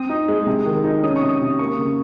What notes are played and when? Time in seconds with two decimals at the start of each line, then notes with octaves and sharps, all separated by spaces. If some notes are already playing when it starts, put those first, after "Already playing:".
Already playing: C4 D#6
0.09 D#4
0.28 G#3
0.46 C3
0.66 D#3
0.84 D#4
1.03 C#4 D#6
1.16 C#6
1.22 C3
1.29 D#6
1.41 C3
1.59 A#3 C#6
1.79 C#3